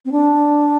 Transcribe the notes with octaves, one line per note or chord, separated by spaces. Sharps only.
C4
D4